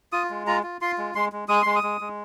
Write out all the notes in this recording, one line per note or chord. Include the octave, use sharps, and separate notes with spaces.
F4 D#6
G#3
F4 A#5
F4
F4 C6
G#3
G#3 C6
G#3
G#3 D#6
G#3 C6
D#6
G#3
G#3